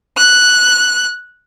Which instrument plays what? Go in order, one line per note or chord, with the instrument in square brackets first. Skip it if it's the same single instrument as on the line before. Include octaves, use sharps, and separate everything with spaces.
[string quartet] F#6